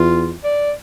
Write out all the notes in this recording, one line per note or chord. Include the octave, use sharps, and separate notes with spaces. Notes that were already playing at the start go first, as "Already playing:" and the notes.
Already playing: E2 F4
D5